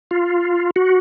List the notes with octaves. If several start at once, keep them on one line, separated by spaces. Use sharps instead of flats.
F4
F#4